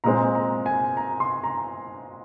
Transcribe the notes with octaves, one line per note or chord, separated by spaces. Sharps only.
A#2 G#3 C4 A#5
A#5
G#5
A#5
C6
A#5